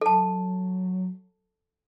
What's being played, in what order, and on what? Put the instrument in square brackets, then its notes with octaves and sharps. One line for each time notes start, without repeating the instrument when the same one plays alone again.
[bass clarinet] F#3 [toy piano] A4 A5